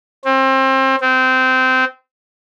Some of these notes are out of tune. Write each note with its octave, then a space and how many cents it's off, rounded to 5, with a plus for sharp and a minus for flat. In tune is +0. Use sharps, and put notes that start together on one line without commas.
C4 +30
C4 -20